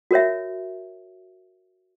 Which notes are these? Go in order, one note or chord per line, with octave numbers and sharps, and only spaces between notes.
F#4 A#4 C#5 E5